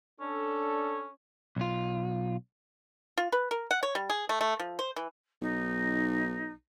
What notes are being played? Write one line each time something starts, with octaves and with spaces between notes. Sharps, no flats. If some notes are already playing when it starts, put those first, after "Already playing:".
C#4 D4 A4
B1 F4
F4
B4
A#4
F#5
C#5
G3
G#4
A3
A3
F3
C5
E3
B1 D#4